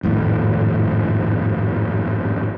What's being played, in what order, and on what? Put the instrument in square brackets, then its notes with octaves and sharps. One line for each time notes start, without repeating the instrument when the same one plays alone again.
[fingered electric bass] G#1 F2 A2